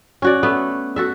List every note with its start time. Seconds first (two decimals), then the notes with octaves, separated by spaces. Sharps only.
0.22 C#4 F#4 D5
0.43 A3 B3
0.96 F#4 A4 E5